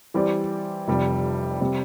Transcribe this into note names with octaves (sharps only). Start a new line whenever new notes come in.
E3 G3 C4 G4 D5
F1 F2 C3 G3
C3 G3 C4